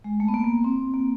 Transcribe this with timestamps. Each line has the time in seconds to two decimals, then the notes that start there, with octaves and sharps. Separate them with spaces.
0.04 G#3
0.20 A3
0.28 B3
0.34 A#3
0.44 A#3
0.64 C4
0.94 A#3